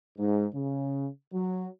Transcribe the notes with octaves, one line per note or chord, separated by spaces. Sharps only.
G#2
C#3
F#3